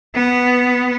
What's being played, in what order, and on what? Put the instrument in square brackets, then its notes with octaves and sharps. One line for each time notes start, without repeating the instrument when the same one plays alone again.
[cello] B3